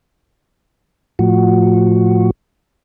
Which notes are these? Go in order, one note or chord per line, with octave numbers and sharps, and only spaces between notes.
A2 F3 F#4